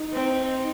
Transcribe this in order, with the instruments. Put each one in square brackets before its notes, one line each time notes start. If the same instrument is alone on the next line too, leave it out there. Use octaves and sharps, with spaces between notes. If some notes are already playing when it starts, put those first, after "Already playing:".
Already playing: [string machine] D#4
[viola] C4